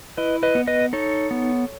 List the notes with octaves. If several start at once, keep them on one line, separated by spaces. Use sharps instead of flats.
E4 B4 D#5
B4 D#5
B3
B4 D#5
D#4 A4 C#5
B3